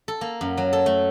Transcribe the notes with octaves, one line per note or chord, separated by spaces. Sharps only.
A4
A#3
F#2
F#3
A4
A3